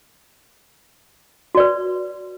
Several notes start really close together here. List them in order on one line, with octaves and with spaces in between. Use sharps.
F#4 D5 B4